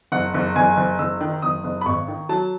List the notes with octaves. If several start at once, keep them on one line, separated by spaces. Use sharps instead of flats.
F#1 F#5
F#1
F#1 G#5
F#1
F#1 E6
D#3
F#1 D#6
F#1
B5
G#1 C#6
D#3
F#3 A5